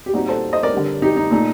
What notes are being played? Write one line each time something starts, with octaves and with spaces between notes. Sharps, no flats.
G4
A#2 G3 C4 D#4 F#4
A4 C5
C5 D#5
A#4 D5
D3 G3 D4
D#4 G4
D#4
A#2 A3 D#4